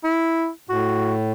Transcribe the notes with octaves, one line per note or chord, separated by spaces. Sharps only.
E4
A2 F#4